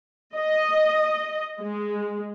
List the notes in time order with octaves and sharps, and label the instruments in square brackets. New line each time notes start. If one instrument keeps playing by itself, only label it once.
[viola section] D#5
G#3